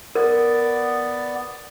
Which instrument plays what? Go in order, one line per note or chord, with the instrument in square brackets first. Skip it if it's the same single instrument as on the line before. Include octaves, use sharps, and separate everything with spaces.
[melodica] B3 D5 [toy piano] A#4